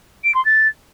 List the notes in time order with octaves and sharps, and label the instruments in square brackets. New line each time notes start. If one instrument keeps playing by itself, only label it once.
[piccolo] D7
C6
A6